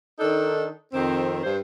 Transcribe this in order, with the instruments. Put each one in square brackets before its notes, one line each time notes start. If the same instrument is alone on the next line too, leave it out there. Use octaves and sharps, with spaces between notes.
[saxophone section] D#3 D4 D#4 A4
F2 D#3 C4
G2 C5